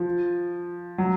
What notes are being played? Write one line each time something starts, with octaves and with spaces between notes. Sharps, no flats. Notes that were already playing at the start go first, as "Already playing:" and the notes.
Already playing: F3
F#3